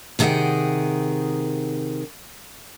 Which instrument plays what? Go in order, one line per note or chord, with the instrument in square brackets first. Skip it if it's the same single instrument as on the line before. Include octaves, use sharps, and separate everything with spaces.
[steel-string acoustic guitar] C3 D#3 G#4 E5 F#5 G5